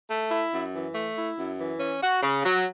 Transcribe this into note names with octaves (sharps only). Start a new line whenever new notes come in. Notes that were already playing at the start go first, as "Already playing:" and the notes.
A3
E4
F#2
E3
A3
E4
F#2
E3
C#4
F#4
C#3
F#3